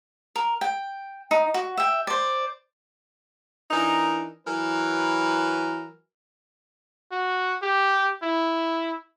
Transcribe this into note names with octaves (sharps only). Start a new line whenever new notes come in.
A#4
G5
D#4
F#4
E5 G5
C5 D5
E3 D4 D#4 A#4
E3 F#3 A#4 B4
F#4
G4
E4